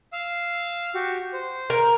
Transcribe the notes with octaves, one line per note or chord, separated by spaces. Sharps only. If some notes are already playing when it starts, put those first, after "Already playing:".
F5 E6
F#4 G4
C5
A#4